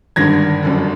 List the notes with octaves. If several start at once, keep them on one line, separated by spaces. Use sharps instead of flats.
G#1 G2 D3 G#6 A#6
G1 F#2 D3